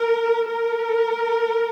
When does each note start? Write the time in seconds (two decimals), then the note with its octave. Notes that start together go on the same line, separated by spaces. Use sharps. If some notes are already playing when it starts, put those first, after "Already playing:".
Already playing: A#4
0.49 A#4